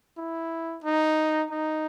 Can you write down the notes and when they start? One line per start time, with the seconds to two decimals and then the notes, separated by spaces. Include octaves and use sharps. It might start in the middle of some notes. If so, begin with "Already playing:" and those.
0.18 E4
0.84 D#4
1.51 D#4